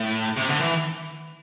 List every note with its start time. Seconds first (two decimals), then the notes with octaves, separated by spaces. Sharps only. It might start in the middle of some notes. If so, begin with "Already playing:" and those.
Already playing: A2
0.37 C3
0.49 D3
0.60 E3